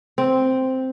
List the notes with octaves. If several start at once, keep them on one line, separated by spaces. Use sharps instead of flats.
C4